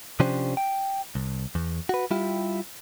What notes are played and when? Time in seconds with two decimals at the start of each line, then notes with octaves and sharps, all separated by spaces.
0.20 C3 F3 C#4 D4 G4 C5
0.57 G5
1.15 C2
1.55 E2
1.89 F#4 B4
2.11 G3 E4 F4 G4